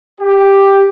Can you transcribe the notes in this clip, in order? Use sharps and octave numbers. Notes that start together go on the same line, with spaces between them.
G4